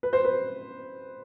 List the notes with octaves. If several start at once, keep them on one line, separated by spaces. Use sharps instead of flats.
B4
C5
B4